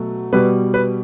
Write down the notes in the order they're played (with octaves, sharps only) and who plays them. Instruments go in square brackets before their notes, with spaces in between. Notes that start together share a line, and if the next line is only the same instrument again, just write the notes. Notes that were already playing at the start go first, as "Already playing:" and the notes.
Already playing: [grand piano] B2 F#3 A3
B2 G3 B4
B4